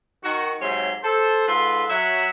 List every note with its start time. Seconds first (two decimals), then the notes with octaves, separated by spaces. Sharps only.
0.24 D#3 F#4
0.61 G#2 C3 F#3 C#5 E5 C6
1.04 A4 C5
1.48 G#2 F4 A4 B4 C6
1.90 F#3 E5 F#5